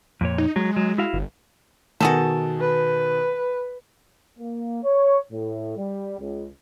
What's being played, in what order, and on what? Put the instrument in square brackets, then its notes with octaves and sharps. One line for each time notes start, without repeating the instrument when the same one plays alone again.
[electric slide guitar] F2 A#2 C#5
[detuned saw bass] D#4
[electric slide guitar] F#3 [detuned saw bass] G#3
[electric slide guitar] F#3
E4 F#4 F5
[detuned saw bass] G1
[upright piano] B2 D#3 [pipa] F#4 G#4 A4
[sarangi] B4
[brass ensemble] A#3
C#5
A2
G3
C#2